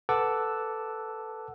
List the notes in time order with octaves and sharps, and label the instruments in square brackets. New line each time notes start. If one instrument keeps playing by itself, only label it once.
[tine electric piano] A4 B4 F#5 A5 D6 E6